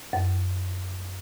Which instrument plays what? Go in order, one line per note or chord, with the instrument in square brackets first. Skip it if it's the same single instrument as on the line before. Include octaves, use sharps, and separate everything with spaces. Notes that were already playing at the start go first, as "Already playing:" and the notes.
[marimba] F#2